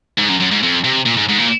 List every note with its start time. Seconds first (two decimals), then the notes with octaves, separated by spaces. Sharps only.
0.18 G#2
0.29 F#2
0.40 F#2
0.51 G#2
0.63 F2
0.84 C3
1.06 A#2
1.17 G#2
1.29 G#2
1.39 A#2